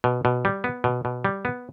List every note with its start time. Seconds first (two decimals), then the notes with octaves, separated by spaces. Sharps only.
0.04 B2
0.25 B2
0.45 G3
0.64 B3
0.84 B2
1.05 B2
1.25 G3
1.45 B3